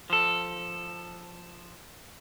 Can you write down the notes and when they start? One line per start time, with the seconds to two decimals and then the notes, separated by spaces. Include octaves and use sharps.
0.10 F3 A4